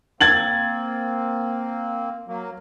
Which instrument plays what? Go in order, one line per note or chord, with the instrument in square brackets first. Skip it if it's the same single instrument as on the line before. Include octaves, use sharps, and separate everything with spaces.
[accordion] A#3 C4 [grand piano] G#6 A6 F#7
[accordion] F#3 A#3